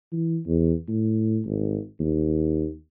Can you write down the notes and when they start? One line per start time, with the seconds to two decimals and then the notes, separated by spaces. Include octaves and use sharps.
0.12 E3
0.47 E2
0.88 A2
1.45 G#1
1.99 D#2